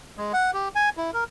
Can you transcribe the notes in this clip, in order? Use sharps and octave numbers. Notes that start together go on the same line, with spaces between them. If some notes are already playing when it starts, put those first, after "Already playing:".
G#3
F#5
G4
G#5
E4
A#4